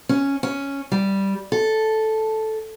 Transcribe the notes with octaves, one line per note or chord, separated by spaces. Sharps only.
C#4
C#4
G3
A4